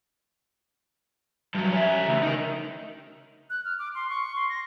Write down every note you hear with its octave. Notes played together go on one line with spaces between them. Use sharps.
G2 F#3
C#4 E5
C#3 A3
D#4 A#4
F#6
F6
D6
C6
C#6
C6
A#6